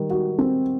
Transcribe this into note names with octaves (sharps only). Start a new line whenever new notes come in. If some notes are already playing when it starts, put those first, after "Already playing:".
Already playing: D#3 G3
F#4
C4